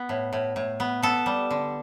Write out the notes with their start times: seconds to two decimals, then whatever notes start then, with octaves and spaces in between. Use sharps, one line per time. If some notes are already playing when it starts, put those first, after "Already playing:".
Already playing: B3
0.09 A2
0.33 A2
0.56 A2
0.80 B3
1.03 B3 A4
1.26 G3
1.51 D3